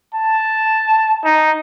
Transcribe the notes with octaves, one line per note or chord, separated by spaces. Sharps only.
A5
D#4